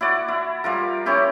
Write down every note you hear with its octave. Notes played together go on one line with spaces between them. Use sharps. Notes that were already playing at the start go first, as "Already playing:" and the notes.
E4 F#4 D5
E4
G3 F4 A#4
C#4 E4 G4 A#4